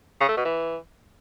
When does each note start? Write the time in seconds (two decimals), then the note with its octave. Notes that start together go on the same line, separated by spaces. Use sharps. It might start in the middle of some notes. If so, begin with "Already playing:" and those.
0.20 C#3
0.28 A3
0.37 B2
0.45 E3